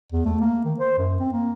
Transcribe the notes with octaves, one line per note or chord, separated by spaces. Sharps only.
E2
A3
A#3
D#3
C5
F#2
C4
A#3